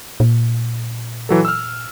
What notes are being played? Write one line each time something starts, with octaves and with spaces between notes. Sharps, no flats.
A#2
E3 F#3 A4
E6 F6